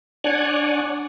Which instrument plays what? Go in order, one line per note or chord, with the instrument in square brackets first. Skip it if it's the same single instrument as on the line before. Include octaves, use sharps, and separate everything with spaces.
[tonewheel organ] D4 C#5 D5 F#5 G#5